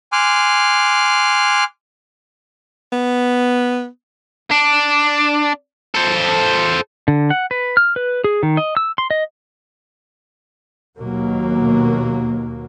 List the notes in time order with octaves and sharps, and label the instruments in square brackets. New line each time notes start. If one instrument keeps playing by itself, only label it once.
[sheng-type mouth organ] G#5 C6 D6 F6 F#6
[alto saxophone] B3
[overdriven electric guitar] D4
A4 C5
[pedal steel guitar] D3
F#5
B4
F6
B4
G#4
D#3
D#5
E6
C6
D#5
[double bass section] D#2 B2 F#3 A#3